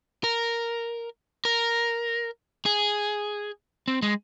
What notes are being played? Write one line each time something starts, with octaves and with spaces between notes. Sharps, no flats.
A#4
A#4
G#4
C4
G#3